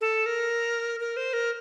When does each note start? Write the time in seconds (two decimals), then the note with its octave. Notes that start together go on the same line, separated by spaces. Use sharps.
0.01 A4
0.26 A#4
1.00 A#4
1.17 C5
1.33 A#4